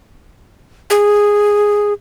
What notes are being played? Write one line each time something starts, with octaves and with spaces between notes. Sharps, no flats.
G#4